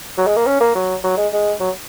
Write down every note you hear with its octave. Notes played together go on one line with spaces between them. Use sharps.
F#3
G#3
A#3
C#4
A#3
F#3
F#3
G#3
G#3
F#3